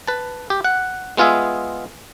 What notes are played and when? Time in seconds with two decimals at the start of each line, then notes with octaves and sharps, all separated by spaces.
0.07 B4 A5
0.50 G4
0.64 F#5
1.17 G#3 B3 F4 G#4 E5